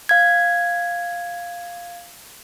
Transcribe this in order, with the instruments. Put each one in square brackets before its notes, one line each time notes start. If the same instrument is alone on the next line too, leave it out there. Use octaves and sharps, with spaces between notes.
[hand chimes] F5 G#6